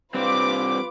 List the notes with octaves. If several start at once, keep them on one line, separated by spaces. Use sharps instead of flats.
G3 C4 D4 F4 B4 D6